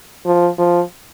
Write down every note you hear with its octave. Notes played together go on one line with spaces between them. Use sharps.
F3
F3